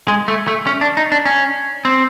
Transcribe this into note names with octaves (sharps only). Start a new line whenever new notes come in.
G#3
A3
A3
C#4
D4
D#4
D4
C#4
C4